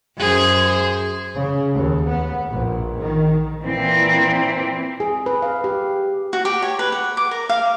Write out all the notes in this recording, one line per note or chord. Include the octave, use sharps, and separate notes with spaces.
F#2 G#4 C5
C#3
D#2
B3
A#1
D#3
A#2 E3 C4
G#4
B4
F5
G4
F#4
G4
C#5
B4
F#5
D6
A#4
F5